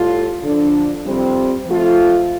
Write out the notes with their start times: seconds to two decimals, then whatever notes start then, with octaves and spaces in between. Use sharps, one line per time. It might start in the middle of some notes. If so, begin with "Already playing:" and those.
Already playing: A2 G3 F4 A4
0.43 D3 F3 D4 A4
1.06 F2 C3 G3 C4
1.68 F3 A3 F4 A4